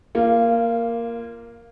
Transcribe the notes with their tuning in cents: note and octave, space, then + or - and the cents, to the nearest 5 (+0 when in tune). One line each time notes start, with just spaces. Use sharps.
A#3 +0 F4 -20